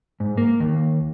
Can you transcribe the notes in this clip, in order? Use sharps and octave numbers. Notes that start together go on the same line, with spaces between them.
G#2
A#3
D#2